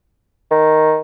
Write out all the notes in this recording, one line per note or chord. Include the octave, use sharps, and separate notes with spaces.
D#3